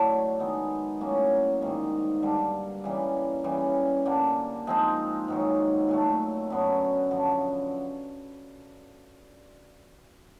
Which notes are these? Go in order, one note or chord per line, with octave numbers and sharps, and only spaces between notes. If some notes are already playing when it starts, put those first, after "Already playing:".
Already playing: A2 D3 F#3 A3 D4
D#3 G#3 B3 D#4
A2 F#3 A#3 C#4
G#2 D#3 G3 A#3
G2 D3 G3
C#3 E3 G3 A#3
C#3 E3 G3
D3 G3 A#3
F3 G#3 C4 D#4
G#2 D#3 F#3
A#2 F#3 A3
F#2 D3 F#3 B3
F#2 D3 F3